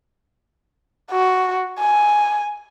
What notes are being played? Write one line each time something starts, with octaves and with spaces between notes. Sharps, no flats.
F#4
G#5